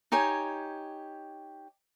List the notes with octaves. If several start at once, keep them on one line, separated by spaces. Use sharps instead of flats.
D#4 G4 C#5 G#5